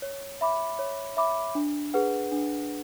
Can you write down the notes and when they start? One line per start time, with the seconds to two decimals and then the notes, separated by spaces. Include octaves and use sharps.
0.02 C#5
0.41 E5 B5 D6
0.79 C#5
1.17 E5 B5 D6
1.55 D4
1.94 G#4 B4 F#5
2.32 D4